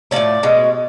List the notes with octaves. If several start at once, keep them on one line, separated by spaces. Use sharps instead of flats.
A2 F3 A#3 C#4 D5
B2 G#3 C#4